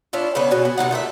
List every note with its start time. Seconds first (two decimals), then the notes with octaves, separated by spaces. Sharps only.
0.13 C#4 D4 E4 F4
0.35 C#3 B3 C#4 B4
0.51 B2 F#4 G#5
0.65 B3
0.78 C3 B3 D#4 F#5
0.91 A#2 A3 A4 E5